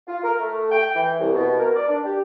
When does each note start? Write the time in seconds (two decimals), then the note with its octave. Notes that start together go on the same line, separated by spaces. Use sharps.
0.08 F4
0.24 A#4
0.40 A3
0.72 G5
0.96 E3
1.19 C2
1.34 B2
1.59 A#4
1.76 D5
1.88 D4
2.05 G4